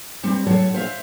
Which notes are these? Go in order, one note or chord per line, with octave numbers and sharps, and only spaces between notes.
G3 C4
A2 F#3 A4 C#5
C5 E5 F5